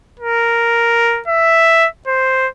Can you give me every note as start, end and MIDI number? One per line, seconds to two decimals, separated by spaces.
0.20 1.21 70
1.28 1.87 76
2.07 2.48 72